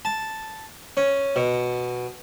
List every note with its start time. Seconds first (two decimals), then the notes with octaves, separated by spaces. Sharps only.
0.05 A5
0.97 C#4
1.36 B2